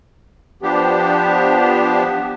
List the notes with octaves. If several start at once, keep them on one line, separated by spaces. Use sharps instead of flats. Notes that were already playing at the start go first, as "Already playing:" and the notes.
F3 B3 D4 G4